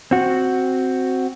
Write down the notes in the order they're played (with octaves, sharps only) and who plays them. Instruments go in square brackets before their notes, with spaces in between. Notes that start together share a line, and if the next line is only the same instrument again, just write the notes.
[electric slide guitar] C4 F#4